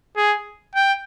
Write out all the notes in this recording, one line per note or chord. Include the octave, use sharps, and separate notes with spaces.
G#4
G5